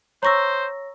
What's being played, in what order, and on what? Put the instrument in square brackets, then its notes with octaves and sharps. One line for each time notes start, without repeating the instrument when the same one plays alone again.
[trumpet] C5 [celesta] C#5 A#6 [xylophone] A#5 C#6 E6